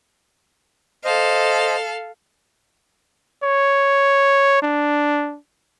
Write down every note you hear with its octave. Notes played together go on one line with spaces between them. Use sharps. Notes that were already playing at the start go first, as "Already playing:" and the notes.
A4 C5 D#5 F5
C#5
D4